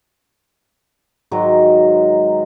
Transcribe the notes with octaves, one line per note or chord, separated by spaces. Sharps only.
G#2 D#3 F#3 G#3